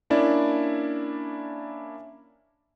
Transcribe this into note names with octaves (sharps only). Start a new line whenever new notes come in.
A#3 C#4 D4 E4 D5